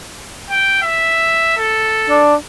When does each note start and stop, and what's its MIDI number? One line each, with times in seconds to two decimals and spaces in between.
0.50 0.81 79
0.83 1.57 76
1.58 2.24 69
2.09 2.35 62